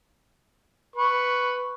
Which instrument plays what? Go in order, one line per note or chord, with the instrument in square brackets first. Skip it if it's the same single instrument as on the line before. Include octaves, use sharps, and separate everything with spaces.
[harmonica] B4 C#6